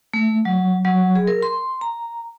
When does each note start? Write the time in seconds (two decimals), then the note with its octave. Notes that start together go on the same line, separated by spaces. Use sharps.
0.14 A3
0.45 F#3
0.85 F#3
1.15 G#4
1.27 A#4
1.43 C6
1.81 A#5